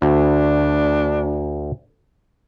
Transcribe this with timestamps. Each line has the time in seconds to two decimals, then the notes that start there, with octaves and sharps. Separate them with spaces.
0.02 D2 D4